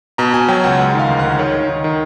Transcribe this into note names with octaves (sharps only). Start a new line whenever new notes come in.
B2 A#5
B2 G#5
F#3 G5
C#2 F#5
G#3 F#5
D#3 F5
D2
D#3 F#5
D#3 C#5
D#3
D#3
D#3